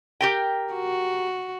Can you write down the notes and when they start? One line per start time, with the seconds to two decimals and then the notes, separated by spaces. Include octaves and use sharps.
0.21 G4 A#4 G5
0.73 F#4